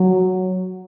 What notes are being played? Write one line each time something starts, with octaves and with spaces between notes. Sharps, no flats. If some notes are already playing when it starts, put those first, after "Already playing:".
Already playing: F#3